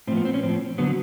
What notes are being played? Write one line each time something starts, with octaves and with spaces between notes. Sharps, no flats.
A2 F3 B3 C4
C4
C#4
A2 F3 C4
D3 F#3 B3